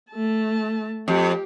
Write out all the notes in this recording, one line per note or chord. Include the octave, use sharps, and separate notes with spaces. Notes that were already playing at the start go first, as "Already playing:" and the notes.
A3 A5
F2 G4